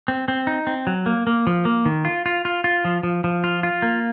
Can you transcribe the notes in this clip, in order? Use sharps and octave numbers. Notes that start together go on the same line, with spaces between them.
C4
C4
D#4
C4
F#3
A#3
A#3
F3
A#3
D#3
F4
F4
F4
F4
F3
F3
F3
F4
F4
A#3